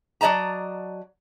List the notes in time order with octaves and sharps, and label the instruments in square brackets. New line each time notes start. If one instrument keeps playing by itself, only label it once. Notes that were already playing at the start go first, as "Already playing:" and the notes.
[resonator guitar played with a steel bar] F#3 D5 D#5 A5 A#5